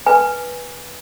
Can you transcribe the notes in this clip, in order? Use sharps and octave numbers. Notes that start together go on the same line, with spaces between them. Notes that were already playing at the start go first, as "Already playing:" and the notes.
B4 G#5